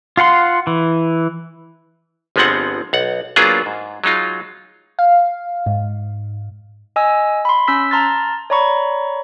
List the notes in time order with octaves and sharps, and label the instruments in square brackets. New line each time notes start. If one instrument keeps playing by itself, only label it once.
[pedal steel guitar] F4 F5 F#5 C6
E3
[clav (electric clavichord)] G1 F3 G#3 B3 C4 F#5
B1 F#5
F#3 A#3 B3 D4 F4 G#4
G#2
F#3 G#3 D#4 F4
[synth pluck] F5
G#2
[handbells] D#5 G#5 E6
B5 C6
C#4 E6 B6
A5 A#5 C6 F6 A6
C#5 D5 A#5 B5 C#6